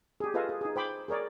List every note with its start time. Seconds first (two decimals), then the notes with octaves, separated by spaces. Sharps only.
0.20 G4 G#4
0.34 F4 A4 B4 D#5 F5 G#5
0.49 G#4
0.61 D#4 G#4
0.76 C5 G5 B5 D6
1.08 G#4 A#4 C#5 D5